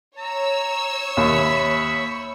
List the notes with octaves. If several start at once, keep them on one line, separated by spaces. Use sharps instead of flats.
C#5 A#5 E6
D#2 E5 B5 C#6